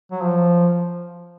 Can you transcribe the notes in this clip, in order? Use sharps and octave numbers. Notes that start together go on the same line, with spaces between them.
F#3
F3